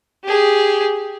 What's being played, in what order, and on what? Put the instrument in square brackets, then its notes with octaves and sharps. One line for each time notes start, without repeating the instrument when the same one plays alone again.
[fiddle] G4 G#4